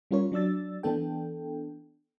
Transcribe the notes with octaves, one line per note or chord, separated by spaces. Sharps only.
G3 C#4 F4 A#4 C#5
F#3 D4 D5 E6 A6
E3 B3 D4 A4 G5